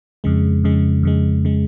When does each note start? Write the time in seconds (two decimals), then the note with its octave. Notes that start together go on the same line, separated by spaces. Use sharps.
0.24 F2 C#3 G#3
0.64 F2 C#3 G#3
1.03 F2 C#3 G#3
1.45 C#3 G#3